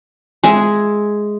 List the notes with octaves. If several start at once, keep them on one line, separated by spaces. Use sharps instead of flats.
G#3 G#4 E5